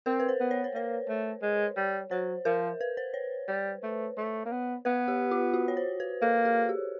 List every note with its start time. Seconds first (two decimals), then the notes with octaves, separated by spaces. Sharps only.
0.06 C4 A#4
0.20 B4
0.29 C5
0.41 B3
0.51 C#5
0.64 C5
0.74 A#3 C#5
1.09 A3
1.42 G#3
1.77 G3
2.11 F#3 C5
2.45 F3 A#4
2.81 B4
2.97 C5
3.14 C#5
3.48 G3
3.83 A3
4.17 A3
4.46 A#3
4.52 B3
4.85 B3 B4
5.08 G4
5.31 F4
5.54 F#4
5.68 C#5
5.77 C5
6.00 B4
6.22 A#3 A4
6.45 G#4
6.69 G4